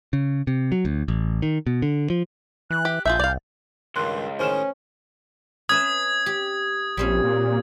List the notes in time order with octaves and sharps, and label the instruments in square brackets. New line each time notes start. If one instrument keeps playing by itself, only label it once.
[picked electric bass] C#3
C3
F#3
D2
A1
D#3
B2
D3
F3
[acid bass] E3 [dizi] F#6
[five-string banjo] G4
[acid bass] A#1 [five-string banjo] F4 G#4 E5 [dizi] G6
[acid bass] C2 [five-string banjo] D5 F5
[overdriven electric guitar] C#2 [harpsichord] G2 D#3 [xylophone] C6 F#6
[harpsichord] A2 D#3 G#3 [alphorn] C#4 [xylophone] C5 F6 E7
[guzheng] C#4 B4 E5 [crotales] D#6 G#6
[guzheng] G4
[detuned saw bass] A#1 [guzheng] G3 C4 C#4
[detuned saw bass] A#2